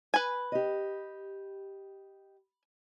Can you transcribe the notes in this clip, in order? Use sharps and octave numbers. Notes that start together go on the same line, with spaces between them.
B4 G#5
G4 D#5